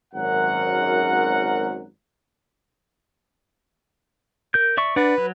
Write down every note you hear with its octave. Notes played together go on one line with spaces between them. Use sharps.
G#1 F#2 A#4 F#5
A#4 G6
D5 E5 C#6
D4 B4 D5 F#5
F#3